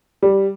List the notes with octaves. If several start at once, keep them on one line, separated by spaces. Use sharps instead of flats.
G3